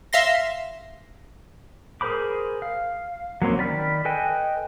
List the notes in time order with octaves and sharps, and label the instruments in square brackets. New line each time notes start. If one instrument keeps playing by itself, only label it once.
[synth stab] E5 F5 C6 A#6
[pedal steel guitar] G#4 A#4 C5 B5 D6
F5
F#3 A#3 C4 C#4
D#3 D5 B5 F6
A4 B4 D#5 G5 G#5